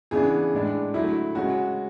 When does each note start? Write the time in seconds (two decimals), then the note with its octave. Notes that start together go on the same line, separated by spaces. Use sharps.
0.11 C#3 E3 B3 D4 G#4
0.53 A2 G#3 D4
0.94 D3 F#3 A3 E4
1.35 C#3 G#3 C#4 F#4